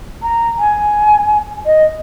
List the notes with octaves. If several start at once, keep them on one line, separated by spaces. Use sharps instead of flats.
A#5
G#5
D#5